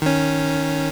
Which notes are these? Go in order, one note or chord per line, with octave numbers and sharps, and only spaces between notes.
D#3 C#4